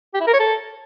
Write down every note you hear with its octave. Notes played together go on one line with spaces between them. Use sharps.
G4
E4
A#4
C#5
A4